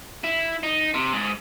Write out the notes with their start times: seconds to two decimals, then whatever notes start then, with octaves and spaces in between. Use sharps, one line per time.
0.24 E4
0.63 D#4
0.95 C3
1.13 G#2